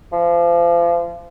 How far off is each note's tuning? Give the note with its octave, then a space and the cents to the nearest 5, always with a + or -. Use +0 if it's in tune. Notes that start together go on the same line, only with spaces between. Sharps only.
F3 -30